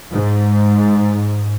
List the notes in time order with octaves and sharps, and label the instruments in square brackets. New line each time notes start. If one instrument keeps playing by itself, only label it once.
[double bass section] G#2